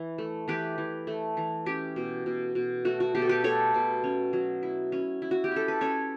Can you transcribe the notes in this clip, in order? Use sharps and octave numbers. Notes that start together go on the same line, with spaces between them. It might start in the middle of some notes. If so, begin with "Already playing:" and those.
Already playing: E3 E4
A3
E3 G4 B4
E3
A3
E3
C#4 G4
B2
B2
B2
A3 F#4
F#4
B2 G4
A4
G4 B4
A3 A4 C#5
B2
C#4
F#3
E4
C#4
E4
F#4
G4
C#4 A4
B4
C#4 A4 C#5